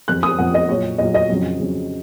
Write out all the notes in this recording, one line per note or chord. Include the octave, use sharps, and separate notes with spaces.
F2 F3 F#6
D#6
F2 F3 F#5
D#5
A#2 F#3 C#5
A#2 F#3 D#5
D#5
F2 C#3 F#3
F2 C#3 F#3